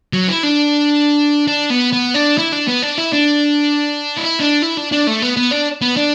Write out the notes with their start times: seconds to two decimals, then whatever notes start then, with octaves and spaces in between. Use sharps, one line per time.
0.13 F#3
0.28 E4
0.43 D4
1.48 D4
1.70 B3
1.93 B3
2.15 D4
2.38 E4
2.52 D4
2.68 B3
2.82 D4
2.98 E4
3.13 D4
4.17 E4
4.40 D4
4.62 E4
4.77 D4
4.92 D4
5.07 A3
5.22 B3
5.37 B3
5.52 D4
5.82 B3
5.97 D4